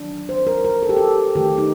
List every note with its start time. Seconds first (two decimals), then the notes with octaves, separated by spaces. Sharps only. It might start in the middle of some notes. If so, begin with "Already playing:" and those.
Already playing: D#3 F#3 D4
0.29 C5
0.47 A#4
0.64 A#4
0.83 A4
0.89 G4
0.97 A4
1.35 D#3 A3 G4
1.58 D#4